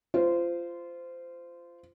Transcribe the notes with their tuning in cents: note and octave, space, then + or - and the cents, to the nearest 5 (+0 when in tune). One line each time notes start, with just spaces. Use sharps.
F4 -20 C5 -20